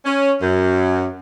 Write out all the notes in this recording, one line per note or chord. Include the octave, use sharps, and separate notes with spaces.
C#4
F#2